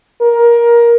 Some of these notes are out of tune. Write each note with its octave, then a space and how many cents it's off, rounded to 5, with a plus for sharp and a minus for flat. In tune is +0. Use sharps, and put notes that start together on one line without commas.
A#4 +20